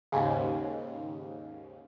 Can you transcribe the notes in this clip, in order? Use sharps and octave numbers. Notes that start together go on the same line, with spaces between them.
D#2 G#2 C#3